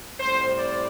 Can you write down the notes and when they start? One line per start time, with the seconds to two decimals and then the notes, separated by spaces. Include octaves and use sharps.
0.20 A2 G3 C4 C5
0.57 D5